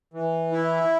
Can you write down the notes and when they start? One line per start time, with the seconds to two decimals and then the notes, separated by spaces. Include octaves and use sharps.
0.14 E3
0.52 E4